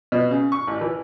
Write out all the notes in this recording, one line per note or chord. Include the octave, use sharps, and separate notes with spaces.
B2
C#3
C#6
A1
E3